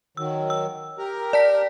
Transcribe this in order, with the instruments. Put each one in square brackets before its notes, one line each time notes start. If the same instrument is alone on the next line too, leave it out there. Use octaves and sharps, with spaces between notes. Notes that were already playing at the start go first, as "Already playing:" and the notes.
[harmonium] D#3 F#3 [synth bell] E6
[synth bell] E6
[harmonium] G4 A#4 A#5
[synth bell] D5 A5 B6